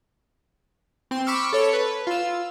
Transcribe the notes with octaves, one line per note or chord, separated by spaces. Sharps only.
C4 C6
B5 C#6 D6 E6 F6
A4 C#5 C#7
B4
F4 E6